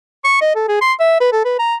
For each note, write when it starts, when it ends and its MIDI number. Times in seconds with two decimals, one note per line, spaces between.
0.24 0.39 85
0.41 0.53 75
0.55 0.65 69
0.68 0.77 68
0.81 0.93 84
1.00 1.20 76
1.21 1.31 71
1.33 1.43 69
1.45 1.57 71
1.59 1.75 82